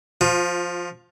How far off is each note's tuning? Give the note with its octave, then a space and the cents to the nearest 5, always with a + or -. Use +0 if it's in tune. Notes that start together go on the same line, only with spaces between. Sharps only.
F3 +0 F4 +25